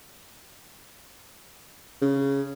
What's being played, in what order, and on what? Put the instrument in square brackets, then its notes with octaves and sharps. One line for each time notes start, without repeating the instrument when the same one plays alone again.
[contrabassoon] C#3